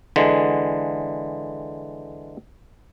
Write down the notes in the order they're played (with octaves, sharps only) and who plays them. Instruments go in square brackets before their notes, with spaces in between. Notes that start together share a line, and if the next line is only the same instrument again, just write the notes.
[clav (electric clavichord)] D3 E3 G#3